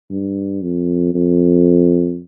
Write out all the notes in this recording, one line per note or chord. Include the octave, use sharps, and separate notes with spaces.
G2
F2
F2